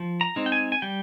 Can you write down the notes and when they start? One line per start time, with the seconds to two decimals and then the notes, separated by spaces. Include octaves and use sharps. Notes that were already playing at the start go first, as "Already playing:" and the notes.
Already playing: F3
0.21 A#5
0.36 G#3 C4 D#4
0.46 G5
0.52 G#5
0.72 G#5
0.82 G3 G5